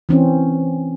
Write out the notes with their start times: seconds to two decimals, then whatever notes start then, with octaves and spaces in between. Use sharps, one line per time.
0.09 E3 C4 C#4